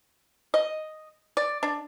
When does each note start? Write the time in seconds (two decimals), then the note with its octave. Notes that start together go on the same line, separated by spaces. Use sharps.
0.54 D#5
1.37 D5
1.63 D4